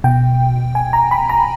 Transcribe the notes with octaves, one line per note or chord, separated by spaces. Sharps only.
B2 G5
G#5
A#5
B5
A#5